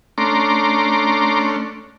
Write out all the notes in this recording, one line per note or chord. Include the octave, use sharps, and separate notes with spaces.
A3 C#4 D4 A#5 C6 D6